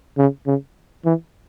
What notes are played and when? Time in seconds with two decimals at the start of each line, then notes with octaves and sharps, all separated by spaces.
0.18 C#3
0.47 C#3
1.05 E3